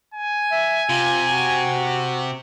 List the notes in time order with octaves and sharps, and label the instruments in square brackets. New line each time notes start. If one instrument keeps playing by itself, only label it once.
[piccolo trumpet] G#5
[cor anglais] E5
[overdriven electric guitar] C3 [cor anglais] F4
[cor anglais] F#4